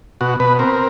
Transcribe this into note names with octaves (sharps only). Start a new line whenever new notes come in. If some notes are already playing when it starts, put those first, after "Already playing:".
B2 F#4
B2 B4
C4 A#4